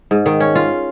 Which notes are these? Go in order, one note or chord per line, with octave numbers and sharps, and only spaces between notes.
G#2
D#3
C#4
F4